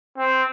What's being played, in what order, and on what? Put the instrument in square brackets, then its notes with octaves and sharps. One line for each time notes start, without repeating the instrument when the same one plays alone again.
[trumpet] C4